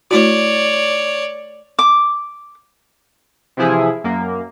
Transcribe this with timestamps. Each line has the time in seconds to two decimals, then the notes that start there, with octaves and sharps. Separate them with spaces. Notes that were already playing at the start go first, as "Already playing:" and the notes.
0.11 A3 E4 F#4 C#5 D5
1.79 D6
3.57 C3 E3 F3 E4 G#4
4.04 F#2 A#3